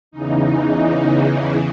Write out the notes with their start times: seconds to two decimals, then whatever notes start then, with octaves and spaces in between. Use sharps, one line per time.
0.11 E2 C#3 E3 D#4